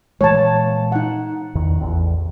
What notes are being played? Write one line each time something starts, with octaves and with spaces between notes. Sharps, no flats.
A#2 E3 G#3 C#5 A5
D#4 F#5
E2 D#3
A1 E2